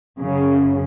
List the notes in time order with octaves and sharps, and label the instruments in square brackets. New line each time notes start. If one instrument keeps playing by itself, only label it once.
[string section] F#2 C#3